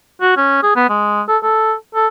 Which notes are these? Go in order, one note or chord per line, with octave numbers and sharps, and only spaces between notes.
F#4
C#4
G#4
B3
G#3
A4
A4
A4